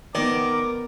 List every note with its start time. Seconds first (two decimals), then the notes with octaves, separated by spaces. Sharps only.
0.15 D#3 B3 A#4 D5 D6